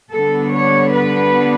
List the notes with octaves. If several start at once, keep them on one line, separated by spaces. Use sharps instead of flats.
D3 G3 B3 D4 A4
C#5
B4